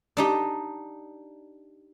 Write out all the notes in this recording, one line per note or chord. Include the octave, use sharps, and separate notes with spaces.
D4 D#4 G4